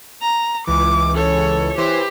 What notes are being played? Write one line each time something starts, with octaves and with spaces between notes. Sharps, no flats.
A#5
C#2 E3 D6
A4 C#5
E3 G4 C5